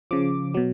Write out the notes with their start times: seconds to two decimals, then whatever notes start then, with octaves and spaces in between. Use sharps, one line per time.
0.11 C#3 F3 D6
0.54 B2 F#3